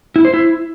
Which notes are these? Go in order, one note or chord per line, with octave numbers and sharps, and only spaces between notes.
E4
C5
E4